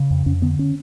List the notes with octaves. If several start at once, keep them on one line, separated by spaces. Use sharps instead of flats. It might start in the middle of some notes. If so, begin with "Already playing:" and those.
Already playing: C#3
F2
F2 C#4
D3 B3
C#4